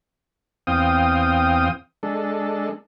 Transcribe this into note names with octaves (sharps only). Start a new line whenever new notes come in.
E2 C4 F5 G5 D#6
G#3 D4 A4